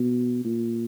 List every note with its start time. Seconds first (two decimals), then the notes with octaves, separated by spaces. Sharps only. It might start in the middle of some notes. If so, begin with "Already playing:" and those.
Already playing: B2
0.45 A#2